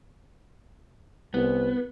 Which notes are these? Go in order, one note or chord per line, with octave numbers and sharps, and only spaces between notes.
C2 B3